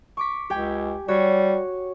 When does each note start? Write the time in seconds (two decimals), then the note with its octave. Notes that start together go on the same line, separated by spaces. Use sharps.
0.17 C#6 D6 B6
0.50 C#2 G4 G5 G#5
1.08 G3 F#4 C#5